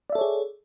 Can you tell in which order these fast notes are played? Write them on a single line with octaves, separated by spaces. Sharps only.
D5 E5 A4 C#5 G#4